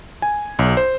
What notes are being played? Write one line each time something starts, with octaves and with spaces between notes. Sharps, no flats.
G#5
B1
C5